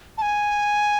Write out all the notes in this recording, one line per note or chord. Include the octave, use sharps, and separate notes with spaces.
A5
G#5